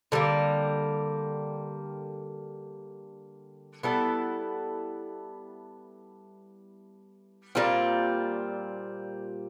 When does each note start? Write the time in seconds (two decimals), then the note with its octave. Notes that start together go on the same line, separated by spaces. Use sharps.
0.12 D3 G3 A#3
3.83 G3 B3 E4 A4
7.55 A#2 G3 C4 F4